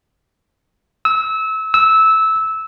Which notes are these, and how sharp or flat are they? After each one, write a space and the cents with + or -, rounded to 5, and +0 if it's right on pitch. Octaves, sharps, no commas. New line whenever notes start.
E6 -25
E6 -15